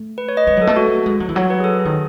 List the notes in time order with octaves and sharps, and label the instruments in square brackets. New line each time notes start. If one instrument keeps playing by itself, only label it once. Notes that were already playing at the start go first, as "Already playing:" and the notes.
Already playing: [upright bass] A3
[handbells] B4
C#5
D#5
[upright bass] G#3 [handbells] B4
[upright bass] F#3 [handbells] A4
[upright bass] A3
[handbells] F#4
[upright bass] G#3
F#3
E3
[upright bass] F#3 [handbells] C#5
[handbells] B4
G#4
A4
G#4
[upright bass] D#3